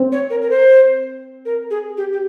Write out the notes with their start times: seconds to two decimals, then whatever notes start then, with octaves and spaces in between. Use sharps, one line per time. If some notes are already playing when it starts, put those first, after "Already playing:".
Already playing: C4
0.12 C#5
0.30 A#4
0.42 A#4
0.50 C5
1.45 A#4
1.70 G#4
1.97 G4
2.12 G4